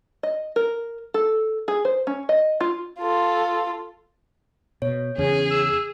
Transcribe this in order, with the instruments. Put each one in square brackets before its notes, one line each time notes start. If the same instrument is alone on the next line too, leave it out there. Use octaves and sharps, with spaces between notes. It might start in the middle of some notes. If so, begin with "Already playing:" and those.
[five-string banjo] D#5
A#4
A4
G#4
C5
C#4
D#5
F4
[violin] F4 A4
[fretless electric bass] B2 [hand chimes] C#5
[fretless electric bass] E2 C#3 [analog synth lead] C#4 [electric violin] G#4
[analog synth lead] E6